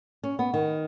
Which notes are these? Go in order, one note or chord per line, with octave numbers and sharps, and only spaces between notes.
C#4
B3
D#3